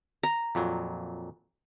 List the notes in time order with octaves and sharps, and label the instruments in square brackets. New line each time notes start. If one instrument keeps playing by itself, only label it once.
[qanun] A#5
[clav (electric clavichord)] F2 A#2 F#3